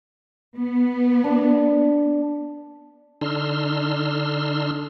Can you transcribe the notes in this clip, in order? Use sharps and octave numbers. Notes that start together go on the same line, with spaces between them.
B3
D4
D3 D4 D#4 C6 E6 F6